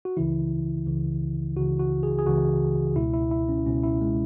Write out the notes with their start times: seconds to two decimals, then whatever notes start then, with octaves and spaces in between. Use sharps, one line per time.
0.05 F#4
0.17 C#2 C#3 E3 E4
0.87 C#2 C#3 E3
1.57 C#2 C#3 E3 F#4
1.79 F#4
2.03 G#4
2.19 G#4
2.26 C#2 C#3 E3 F#4
2.96 C#2 B2 E4
3.14 E4
3.31 E4
3.49 C#4
3.66 C#2 B2 C#4
3.84 E4
4.01 G#3